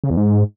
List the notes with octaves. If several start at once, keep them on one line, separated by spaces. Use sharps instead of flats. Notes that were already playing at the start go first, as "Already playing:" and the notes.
C#3
E2
G#2